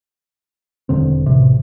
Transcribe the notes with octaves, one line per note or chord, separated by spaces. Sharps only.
E1 D3 C4
A1 C3